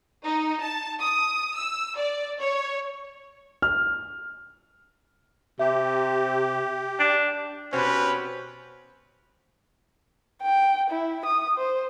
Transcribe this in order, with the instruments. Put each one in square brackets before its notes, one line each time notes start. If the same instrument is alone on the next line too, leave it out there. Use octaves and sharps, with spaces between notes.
[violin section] D#4
A5
D#6
E6
D5
C#5
[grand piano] F6
[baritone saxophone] C3 [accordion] G4 [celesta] E5
[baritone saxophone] D4
[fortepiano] B2 C4 [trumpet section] C#4 G4 B4
[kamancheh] G5
E4
D#6
C5